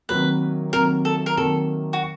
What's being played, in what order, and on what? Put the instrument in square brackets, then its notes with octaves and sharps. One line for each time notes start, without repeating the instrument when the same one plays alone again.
[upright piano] C3 D#3 F#3 A#3 [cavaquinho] B4
[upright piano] C3 D#3 F#3 A#3 [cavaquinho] A#4
[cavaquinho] A4
A#4
[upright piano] C3 D#3 F#3 A#3 [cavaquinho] A4
[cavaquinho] F#4